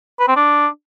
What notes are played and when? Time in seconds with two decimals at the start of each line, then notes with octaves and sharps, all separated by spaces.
0.20 B4
0.28 C4
0.36 D4